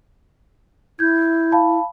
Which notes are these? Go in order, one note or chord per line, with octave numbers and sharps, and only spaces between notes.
E4 G6 G#6
F5 A5 B5